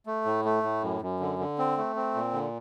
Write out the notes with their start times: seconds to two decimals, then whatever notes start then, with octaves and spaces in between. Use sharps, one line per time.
0.06 A3
0.25 A2
0.45 A3
0.63 A2
0.82 F#2
1.01 F#2
1.20 D3
1.39 D3
1.58 C4
1.77 A3
1.96 C4
2.15 A#2
2.33 D3